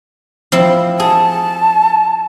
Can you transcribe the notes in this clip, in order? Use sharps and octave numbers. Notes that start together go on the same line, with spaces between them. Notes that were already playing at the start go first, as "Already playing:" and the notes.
F3 C4 E4
G#4 A5